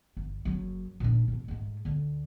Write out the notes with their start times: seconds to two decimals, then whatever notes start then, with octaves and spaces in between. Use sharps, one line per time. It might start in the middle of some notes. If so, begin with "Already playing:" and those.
0.17 G1
0.45 F#1 F#2
1.00 A#2 D4
1.28 F#1 A2
1.48 G#2 A3
1.85 D2 D3